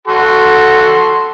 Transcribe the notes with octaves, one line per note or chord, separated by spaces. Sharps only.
F#4 A4 C6